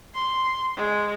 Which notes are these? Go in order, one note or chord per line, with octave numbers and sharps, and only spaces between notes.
C6
G#3